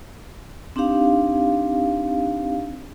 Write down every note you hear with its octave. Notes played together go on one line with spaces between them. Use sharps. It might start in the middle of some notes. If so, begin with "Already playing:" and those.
C4 D4 D#4 G4 F5